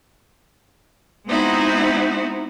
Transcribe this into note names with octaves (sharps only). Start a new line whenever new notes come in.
G#3 B3 C4 D#4 E4 F#4